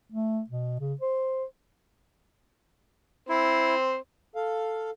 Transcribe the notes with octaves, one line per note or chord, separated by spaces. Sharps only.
A3
B2
C#3
C5
C4 E4 C5
A4 F5